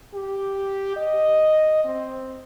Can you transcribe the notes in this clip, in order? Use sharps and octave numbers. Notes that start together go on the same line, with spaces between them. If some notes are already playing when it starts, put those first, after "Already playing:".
G4
D#5
C4